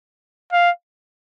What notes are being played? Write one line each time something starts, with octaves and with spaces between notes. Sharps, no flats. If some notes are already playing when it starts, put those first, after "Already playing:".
F5